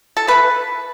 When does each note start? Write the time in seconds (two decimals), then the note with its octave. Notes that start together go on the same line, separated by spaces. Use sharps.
0.17 A4
0.27 E3 A3 B4